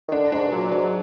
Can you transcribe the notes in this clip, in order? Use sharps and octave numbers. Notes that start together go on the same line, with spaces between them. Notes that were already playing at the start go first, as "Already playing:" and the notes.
D#3
D3 D4
G#2 D4
B2
A#2 F#3
G#2 F#3